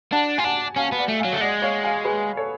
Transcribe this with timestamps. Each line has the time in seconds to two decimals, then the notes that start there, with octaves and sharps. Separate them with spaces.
0.12 D4 F#5 A5
0.38 F4 G#5
0.44 D4 F#5 A5
0.76 C#4 F5 G#5
0.92 B3
0.98 D5 F#5
1.09 A3
1.20 F5 G#5
1.25 F#3
1.33 A3
1.41 G#3 D5 F#5
1.62 C#5 F5
1.84 F5 G#5
2.05 G#4 B4
2.37 A4 C#5